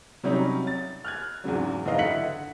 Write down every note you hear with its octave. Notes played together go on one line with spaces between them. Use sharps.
C3 F#3 G3 C#4 D#4
A6
F6 F#6 G#6
E2 G#2 C#3 F#3
F#1 G#2 E3 B4 D#5 F5
D3 E4 F#5 B6 C#7 F#7